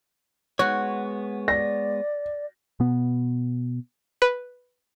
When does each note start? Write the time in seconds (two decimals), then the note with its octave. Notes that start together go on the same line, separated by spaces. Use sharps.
0.59 G#3 B3 F#4 C#5
1.48 D5 A#6
2.80 B2 B3
4.22 B4